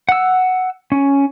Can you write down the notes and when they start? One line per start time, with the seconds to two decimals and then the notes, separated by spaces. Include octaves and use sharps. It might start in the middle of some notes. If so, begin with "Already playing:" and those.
0.09 F#5 E6
0.92 C#4